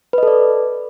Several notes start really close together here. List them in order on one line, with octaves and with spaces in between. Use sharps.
B4 D#5 A4 D5